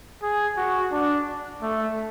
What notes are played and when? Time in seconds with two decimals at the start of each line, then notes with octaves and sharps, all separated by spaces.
0.22 G#4
0.57 F#4
0.92 D4
1.62 A3